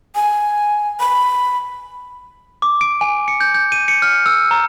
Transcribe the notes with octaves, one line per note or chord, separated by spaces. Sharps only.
G#5
B5
D6
D7
G#5
C#7
G6
G6
D#7
C#7
F6
E6
A#5